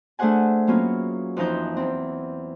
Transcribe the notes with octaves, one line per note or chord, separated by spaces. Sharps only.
A3 D4 G#4 C5 F#5 G#5
F#3 A#3 B3 C#4 F4
F2 E3 F3 D#4 G6
E2 C4